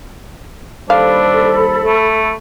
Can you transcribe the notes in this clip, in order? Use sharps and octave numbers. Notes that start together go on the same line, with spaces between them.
D#2 G3 D4 A4 C5 F5 B5
A3